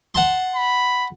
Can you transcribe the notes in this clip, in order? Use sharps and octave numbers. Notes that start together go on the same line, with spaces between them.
F#5 A5 C6
B5